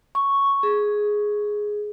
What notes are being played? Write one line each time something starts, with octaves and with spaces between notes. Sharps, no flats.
C#6
G#4